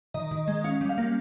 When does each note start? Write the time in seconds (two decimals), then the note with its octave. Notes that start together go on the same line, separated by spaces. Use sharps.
0.14 D#3 D#5
0.31 D#3
0.48 G#3
0.64 C#4 F5
0.81 G3
0.89 F5
0.98 A#3